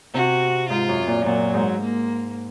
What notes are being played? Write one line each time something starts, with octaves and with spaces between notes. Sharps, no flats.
C3 F#4
G#2 F4
F#2
A#2
A#2 F#3
G#2
A#3